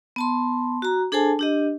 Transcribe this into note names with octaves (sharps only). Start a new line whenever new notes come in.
B3 A5 C6
F#4 A#5
D4 G#4 A4 C5 G#5 A5
D4 G4 D#5